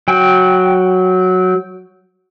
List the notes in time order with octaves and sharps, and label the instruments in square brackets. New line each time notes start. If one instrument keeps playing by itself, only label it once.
[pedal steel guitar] F#3 G5